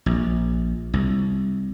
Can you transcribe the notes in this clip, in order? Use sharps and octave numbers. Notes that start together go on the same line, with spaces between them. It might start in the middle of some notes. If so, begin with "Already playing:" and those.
A#1
C2